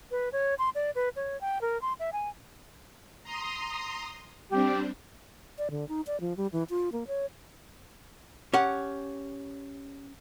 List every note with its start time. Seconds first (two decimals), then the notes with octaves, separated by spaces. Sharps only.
0.11 B4
0.32 C#5
0.59 C6
0.75 D5
0.95 B4
1.16 C#5
1.41 G5
1.61 A#4
1.82 C6
2.00 E5
2.13 G#5
3.24 A#5 C6 D#6
4.50 G3 C4 D4 G4
5.58 D5
5.71 D3
5.89 D#4
6.07 D5
6.21 F3
6.37 G3
6.52 E3
6.70 F4
6.92 A#3
7.07 C#5
8.54 C#4 G4 F#5